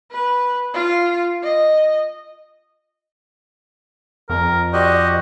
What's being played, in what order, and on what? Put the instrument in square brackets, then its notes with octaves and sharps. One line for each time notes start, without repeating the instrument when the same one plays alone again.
[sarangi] B4
F4
D#5
[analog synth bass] F2 [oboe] A#4
[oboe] F#4 [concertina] G4 C5 D#5 [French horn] D5